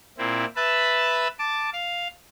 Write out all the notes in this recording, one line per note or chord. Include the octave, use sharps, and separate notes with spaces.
A#2 C4 E4
B4 E5 A5 B5
A5 D6
F5